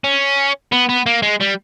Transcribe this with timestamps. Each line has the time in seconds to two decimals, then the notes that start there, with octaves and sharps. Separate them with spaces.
0.04 C#4
0.72 B3
0.89 B3
1.06 A#3
1.22 G#3
1.40 G3